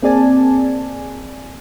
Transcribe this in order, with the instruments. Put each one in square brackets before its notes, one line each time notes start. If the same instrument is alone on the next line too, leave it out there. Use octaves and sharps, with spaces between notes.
[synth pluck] A#3 C4 G#4 D5 G#5 A5